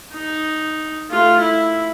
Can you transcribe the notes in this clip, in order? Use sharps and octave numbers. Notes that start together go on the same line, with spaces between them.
D#4
A3 F4
E4